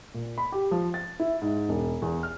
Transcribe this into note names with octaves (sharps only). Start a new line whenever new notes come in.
A#2
B5
G4
F3
A6
E4
G#2
E1
E2
F6